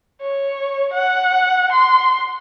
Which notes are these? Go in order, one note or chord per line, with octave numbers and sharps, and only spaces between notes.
C#5
F#5
C6